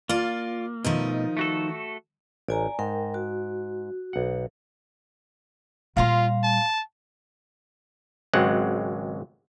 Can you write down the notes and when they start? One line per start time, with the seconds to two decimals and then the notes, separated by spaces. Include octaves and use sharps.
0.09 A#3 F4 D5
0.84 B2 D#3 F3 A3 D#4
1.37 A3 F#4 A4
2.48 A1 D5 G#5 A#5
2.79 G#2 A#4 G5
3.14 F#4
4.13 B1 F#5
5.97 A#2 G3 F4 F5 A#5 C6
6.44 A5
8.33 G#1 C#2 F#3 G#3 C4 F#5